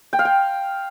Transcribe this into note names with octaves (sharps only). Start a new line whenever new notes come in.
G5
F5
G5